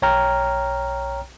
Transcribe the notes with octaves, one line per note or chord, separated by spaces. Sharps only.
B1 C#5 G5 A#5 F6